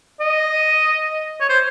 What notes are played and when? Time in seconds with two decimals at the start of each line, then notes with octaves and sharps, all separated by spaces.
0.20 D#5
1.40 C#5
1.49 C5